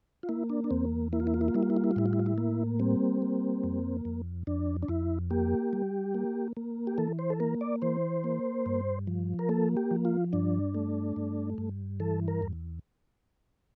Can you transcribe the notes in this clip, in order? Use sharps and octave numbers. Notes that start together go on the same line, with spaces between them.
F4
A#3 E4
D4
D4
E2 C4
A#3 E4
F4
E4
F4
E4
F4
G3 E4
F4
E4
F4
E4
F4
A2 E4
F4
E4
F4
E4
A#3
G3 C4
A#3
F2
F2
F2 D4
D4
F2 E4
A#3 G4
G3
A#3
A#3
G4
E3 A4
C5
A4
A#3 A#4
D5
E3 C5
A#3
G2
F3
A#4
A#3 A4
G4
F3
F4
G2 D4
A3
G2
G2
E3 A4
A#4
E2